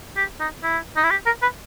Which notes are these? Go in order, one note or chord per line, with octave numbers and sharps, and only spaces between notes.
G4
D#4
E4
D#4
E4
G4
A#4
B4